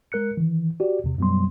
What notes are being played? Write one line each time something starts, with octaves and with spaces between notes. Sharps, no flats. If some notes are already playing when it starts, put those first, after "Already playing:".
G#3 A#4 F#6 C#7
D#3 E3
F#4 G4 D5
E2 C3
F#2 B2 F#3 G3 B3 C6